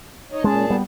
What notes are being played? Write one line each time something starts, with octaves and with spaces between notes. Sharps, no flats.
D#4 C#5 D#5
A#2 G#3 C#4 G#4 A5
G3 B3